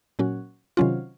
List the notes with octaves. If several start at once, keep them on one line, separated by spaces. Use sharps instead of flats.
A#2 F#3 C#4 F#4
C3 D#3 F#3 C#4 F4